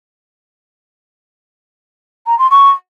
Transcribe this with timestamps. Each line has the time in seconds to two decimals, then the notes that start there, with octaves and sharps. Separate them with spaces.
2.27 A#5
2.39 C6
2.50 C#6